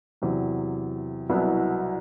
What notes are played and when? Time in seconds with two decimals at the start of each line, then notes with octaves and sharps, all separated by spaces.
0.22 E2 C3 F#3
1.29 C2 B2 F#3 B3 E4